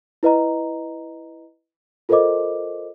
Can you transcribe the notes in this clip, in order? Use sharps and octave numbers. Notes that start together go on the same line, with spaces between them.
E4 B4 D#5 A#5
F4 A4 A#4 C5 D#5 D6